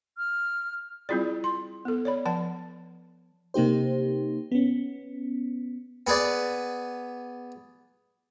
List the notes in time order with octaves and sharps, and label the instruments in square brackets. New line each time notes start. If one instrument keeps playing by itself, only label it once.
[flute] F6
[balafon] G3 C4 E4 F4 G#4 D5
C6
B3 A4
C#5 D5 B5
F3 D5 F#5 A5
[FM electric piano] C3 A#3 D#4 G4 C5
B3 C#4
[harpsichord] B3 G#4 B4 D5